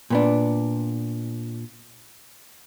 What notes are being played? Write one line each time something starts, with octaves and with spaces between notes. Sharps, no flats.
A#2 B3 D4